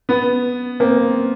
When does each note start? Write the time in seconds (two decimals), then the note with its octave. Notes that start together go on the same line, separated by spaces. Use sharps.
0.09 B3
0.80 A#3 C4